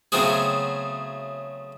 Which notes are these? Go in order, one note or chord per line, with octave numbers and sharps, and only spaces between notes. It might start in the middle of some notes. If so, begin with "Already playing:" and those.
C#3 F#3 A3 B3 C4 G#4